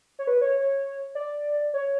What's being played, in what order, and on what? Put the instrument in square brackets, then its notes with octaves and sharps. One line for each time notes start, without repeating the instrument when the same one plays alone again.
[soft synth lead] C#5
B4
C#5
C#5
D5
C#5